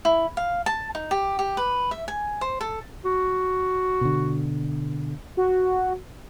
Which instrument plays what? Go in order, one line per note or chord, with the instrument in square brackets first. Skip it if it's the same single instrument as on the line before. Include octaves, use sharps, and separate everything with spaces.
[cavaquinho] E4
F5
A5
D#4
G4
G4
B4
E5
G#5
C5
A4
[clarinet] F#4
[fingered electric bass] B2 D3
[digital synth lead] F#4